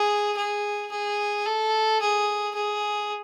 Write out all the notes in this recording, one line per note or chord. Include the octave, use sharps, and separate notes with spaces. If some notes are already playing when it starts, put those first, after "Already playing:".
Already playing: G#4
G#4
G#4
A4
G#4
G#4